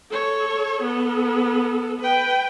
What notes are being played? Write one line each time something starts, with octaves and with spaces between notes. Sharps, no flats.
A4 C#5
B3 A4
B4 G5